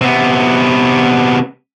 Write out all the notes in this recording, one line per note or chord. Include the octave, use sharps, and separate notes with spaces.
C3 B3